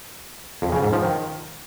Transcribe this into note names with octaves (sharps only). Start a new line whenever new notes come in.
F2
C#3
G#2
F3
D#3